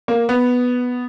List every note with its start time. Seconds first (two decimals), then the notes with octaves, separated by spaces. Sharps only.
0.08 A#3
0.29 B3